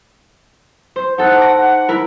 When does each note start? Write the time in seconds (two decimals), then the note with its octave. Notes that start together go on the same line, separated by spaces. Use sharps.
0.96 C5
1.18 D#4 A4 F#5
1.38 D6 A#6
1.59 F#5
1.89 E4 A#4